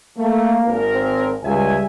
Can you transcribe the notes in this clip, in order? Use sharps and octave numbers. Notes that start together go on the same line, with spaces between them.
A3 A#3
G#1 A#4
C4
C#2 G3 E5 G#5